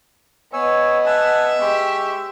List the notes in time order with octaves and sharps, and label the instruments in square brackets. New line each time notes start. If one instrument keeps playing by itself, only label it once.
[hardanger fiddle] B3 [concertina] C#5 G#5 E6 [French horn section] D#5
[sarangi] E5 [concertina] F#5 G#5 A5
[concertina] G#3 C#6 [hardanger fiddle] G4